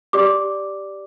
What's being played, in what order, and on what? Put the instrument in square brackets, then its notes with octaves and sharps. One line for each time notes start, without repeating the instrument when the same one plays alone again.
[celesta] G4 D5 D6